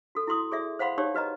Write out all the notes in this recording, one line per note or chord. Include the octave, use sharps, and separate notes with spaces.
F#4 A4
E4 F#4 C6 D#6
G#4 D5 E5
C5 F5 F#5 B5 C6
D#4 G4 C#5 D5
F#4 B4 D#5 A#5